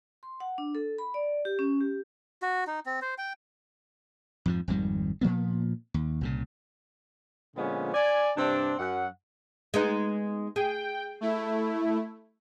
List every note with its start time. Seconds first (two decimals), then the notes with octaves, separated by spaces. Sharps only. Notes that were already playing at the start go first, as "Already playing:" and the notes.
0.23 C6
0.40 F#5
0.58 D4
0.75 A4
0.98 B5
1.14 D5
1.45 G4
1.59 C#4
1.81 G4
2.42 F#4
2.67 D#4
2.86 C4
3.02 C5
3.18 G5
4.46 F2 G#2 F3
4.68 G#1 F2 D#3 G3
5.21 A#2 F3 A#3 B3
5.94 D#2
6.21 C2 A#2 C#3
7.56 A#2 D3 F3 G#3 B3 C#4
7.94 D5 G#5
8.36 G2 C3 C4 D4
8.79 F#2 F#5
9.74 G#3 B3 D#4
10.56 G#4 G5
11.21 A3 E4